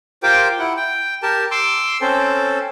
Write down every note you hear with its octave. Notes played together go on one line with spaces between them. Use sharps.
F4 G4 A#4 C5 G5 D6
E4 F#5
G5
G4 A#4 A5
C6 D6 E6
C4 C#4 A4 C5